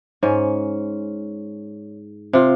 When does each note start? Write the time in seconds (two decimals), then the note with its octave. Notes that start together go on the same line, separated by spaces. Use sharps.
0.23 G#2 C#4
2.33 C3 F4